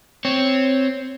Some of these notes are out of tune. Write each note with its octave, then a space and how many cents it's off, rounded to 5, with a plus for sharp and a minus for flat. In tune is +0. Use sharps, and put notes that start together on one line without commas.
C4 +0 C#5 +0